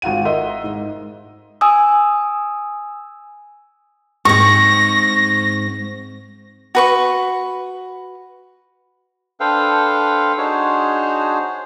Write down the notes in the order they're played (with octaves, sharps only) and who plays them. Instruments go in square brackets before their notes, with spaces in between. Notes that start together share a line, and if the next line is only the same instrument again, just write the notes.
[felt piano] G#1 F4 F#5 D#7
A#4 D#5 E5 F#5 C6
G#2
[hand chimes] G#5 D#6 E6
[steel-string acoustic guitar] G#2 C4 [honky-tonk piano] C#6 [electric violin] A#6
[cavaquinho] F#4 B4 C#6
[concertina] D4 A4 B4 C5 F5 G5
D4 D#4 F#4 G#4 C5 C#5